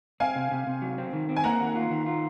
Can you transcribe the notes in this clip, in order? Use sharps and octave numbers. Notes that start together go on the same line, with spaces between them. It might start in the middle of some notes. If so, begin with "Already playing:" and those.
C4 F5 G#5
C3
C3
C3
F#3
C4
D#3
C4
G#5
A#3 F#5 A#5
D#3
F4
D#3
F4